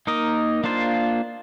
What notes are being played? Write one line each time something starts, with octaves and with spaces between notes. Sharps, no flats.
A#3 D#4 A#4 D#5
A#3 D4 F4 C5